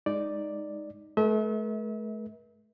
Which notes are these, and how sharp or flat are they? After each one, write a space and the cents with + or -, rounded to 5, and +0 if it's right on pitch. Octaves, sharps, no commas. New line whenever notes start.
G#3 +0 D#4 +0 D5 +0
A3 -35 A#4 +45 E5 -40